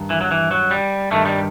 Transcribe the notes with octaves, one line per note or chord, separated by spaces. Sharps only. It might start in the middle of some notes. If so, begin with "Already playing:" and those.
Already playing: G2 D#3
E3
F#3
E3
F#3
G3
G2 D#3 A3
G3